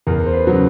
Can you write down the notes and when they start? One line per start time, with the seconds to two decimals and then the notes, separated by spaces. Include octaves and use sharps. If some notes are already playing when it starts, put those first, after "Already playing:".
0.07 E2 A#4
0.26 C5
0.33 B4
0.47 C#3 F#3